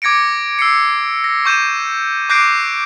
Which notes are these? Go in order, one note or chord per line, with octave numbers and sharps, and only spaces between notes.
D6 G#6 A#6 C#7 D7
E6 C7 C#7
A#6
C#6 G6 D#7 E7
D6 F#6 G6 A#6 C7 D7